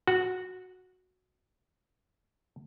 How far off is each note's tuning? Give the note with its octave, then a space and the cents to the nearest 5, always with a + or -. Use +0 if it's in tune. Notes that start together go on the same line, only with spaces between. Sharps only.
F#4 -10